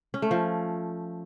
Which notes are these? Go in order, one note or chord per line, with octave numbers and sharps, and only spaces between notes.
C#4
A3
F3